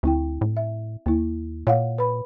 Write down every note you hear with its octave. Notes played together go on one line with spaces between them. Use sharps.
D2 C4 E4 G5
A2
E5
D#2 A#3 E4
A#2 C#5 F5 F#5
B4 B5